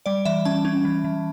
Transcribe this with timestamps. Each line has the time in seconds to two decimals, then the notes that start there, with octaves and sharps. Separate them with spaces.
0.06 G3 D5
0.25 E3 E5
0.45 C#4 A5
0.65 C#4
0.85 E3
1.04 E3